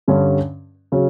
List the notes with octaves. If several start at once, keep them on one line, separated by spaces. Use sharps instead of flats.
G2 D3 G3 C#4
C#3 F#3 C#4